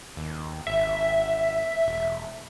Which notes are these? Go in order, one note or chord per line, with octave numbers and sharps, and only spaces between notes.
D#2
G#1 E5
E1